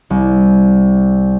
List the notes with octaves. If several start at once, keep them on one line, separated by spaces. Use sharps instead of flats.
C2